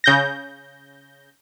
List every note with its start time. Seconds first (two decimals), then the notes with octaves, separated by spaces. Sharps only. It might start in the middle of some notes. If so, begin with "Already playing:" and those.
0.04 C#3 G6 A#6